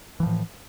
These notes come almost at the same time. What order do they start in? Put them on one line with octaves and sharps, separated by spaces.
E3 F3 A2